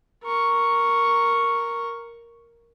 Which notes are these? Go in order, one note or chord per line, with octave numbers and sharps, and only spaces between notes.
A#4 C#6